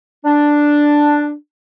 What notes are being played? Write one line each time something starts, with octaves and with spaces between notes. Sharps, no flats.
D4